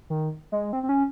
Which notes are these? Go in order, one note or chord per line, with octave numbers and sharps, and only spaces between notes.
D#3
G#3
C4
C4
C#4